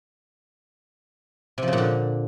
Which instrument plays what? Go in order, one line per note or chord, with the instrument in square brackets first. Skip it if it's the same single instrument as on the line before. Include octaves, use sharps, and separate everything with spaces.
[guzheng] C3
F3
C#3
A#2
D3